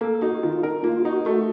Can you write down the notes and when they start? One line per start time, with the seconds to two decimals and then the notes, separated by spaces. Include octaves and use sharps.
0.01 A#3 A4
0.21 D#4 F#4
0.43 D#3 F4
0.63 D#4 A#4
0.84 A#3 F4
1.05 D#4 F#4
1.25 A3 F#4